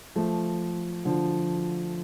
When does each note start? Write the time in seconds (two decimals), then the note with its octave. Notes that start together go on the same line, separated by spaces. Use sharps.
0.16 F3 A3
1.05 D3 F3